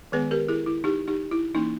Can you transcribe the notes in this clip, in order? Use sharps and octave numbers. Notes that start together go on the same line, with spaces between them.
D#3 G#3 B3 G#4 B4
G4 A#4
E4 G#4
E4
D#4 G4
D#4 G4
E4
E3 A#3 C#4 D#4